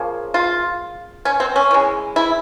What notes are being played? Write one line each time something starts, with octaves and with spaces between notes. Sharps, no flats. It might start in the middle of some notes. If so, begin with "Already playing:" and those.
Already playing: C#3 F3 A#3
F4
C#4
C4
C#4
E3 G#3
E4